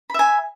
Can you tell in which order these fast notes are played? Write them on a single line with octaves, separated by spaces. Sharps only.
B5 E5 G#5